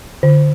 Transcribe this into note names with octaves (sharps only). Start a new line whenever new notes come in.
D3